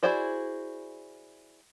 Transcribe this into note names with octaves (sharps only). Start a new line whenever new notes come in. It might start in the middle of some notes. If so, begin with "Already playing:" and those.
E4 F#4 G#4 C5 D5